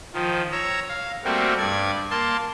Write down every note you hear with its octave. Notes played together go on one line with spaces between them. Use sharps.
D#3 F3
C#5 A#5 E6
F5
G3 A3 A#3 C4 F#4
G2 D5 G#6
A#3 A5 C6